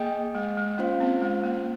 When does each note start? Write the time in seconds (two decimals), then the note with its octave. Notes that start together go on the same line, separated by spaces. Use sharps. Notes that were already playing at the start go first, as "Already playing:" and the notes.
Already playing: A#3 G#4 D#5 G5
0.35 G#3
0.57 G#3
0.78 A#3 C#4 F4 C5 F5
1.00 C4
1.21 G#3
1.44 A#3